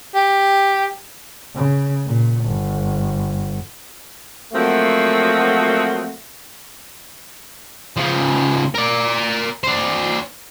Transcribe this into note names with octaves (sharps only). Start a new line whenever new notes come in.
G4
C#3
A#2
G1
F3 F#3 A3 A#3 C4 F#4
C#3 F3
A#4 D5
D4 C5